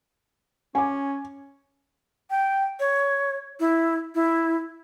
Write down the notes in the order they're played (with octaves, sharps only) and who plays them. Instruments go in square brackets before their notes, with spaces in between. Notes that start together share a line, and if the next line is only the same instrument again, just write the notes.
[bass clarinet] C#4 [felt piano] G#5 D6
[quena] G5
C#5
E4
E4